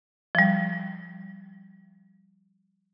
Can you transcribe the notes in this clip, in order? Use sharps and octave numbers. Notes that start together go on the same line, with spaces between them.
F3 G3